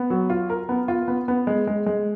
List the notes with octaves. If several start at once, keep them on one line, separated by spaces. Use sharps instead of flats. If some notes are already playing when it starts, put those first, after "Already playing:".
Already playing: B3
F#3
F4
A#4
B3
F4
B3
B3
G#3
G#3
G#3